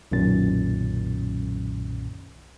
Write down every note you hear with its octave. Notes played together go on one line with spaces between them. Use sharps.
B1 F#2 A#2 D#3 C#4 A6